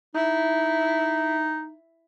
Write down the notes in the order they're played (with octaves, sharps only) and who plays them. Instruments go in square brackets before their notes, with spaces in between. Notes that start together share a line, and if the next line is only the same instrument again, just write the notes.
[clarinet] D#4 [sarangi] E4